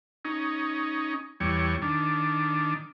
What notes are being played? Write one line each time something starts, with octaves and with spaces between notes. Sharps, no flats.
C#4 D#4
E2 G3 C#5
D#3 D4